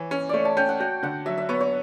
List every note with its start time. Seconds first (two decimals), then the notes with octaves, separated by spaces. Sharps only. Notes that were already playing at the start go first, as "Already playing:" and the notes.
Already playing: E3 C#5
0.11 C#4
0.29 A3 C#5 D5
0.45 A5
0.57 C#4 G5
0.69 F#5
0.80 F#4 G5
1.03 D3 F#5
1.26 F#3 E5
1.38 E5
1.49 B3 C#5
1.61 C#5